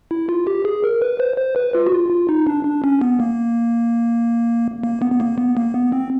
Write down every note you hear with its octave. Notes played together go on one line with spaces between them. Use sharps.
E4
F4
G4
G#4
A#4
B4
C5
C5
B4
F4
F#4
F4
F4
D#4
D4
D4
C#4
B3
A#3
A#3
B3
B3
A#3
B3
A#3
B3
C4